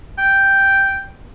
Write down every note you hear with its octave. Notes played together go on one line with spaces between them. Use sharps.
G5